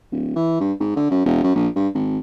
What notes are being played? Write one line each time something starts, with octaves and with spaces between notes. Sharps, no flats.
D1
E3
G2
G#2
D3
F#2
E1
F#2
A#1
G2
G#1